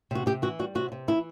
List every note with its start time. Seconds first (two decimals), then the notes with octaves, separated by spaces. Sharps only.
0.11 C3 F#4
0.26 C3 G4
0.42 E3 F#4
0.59 G3 F#4
0.75 C3 F#4
0.92 C3
1.08 E3 E4